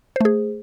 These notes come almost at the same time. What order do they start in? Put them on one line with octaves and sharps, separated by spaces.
C5 A3 G#4